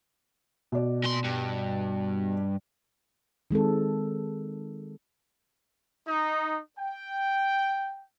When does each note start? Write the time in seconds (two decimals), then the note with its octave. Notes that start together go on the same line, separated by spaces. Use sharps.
0.72 B2 D5
1.03 A#2 C6
1.24 G2
3.51 D#3 G#3 C4 A4
6.06 D#4
6.76 G5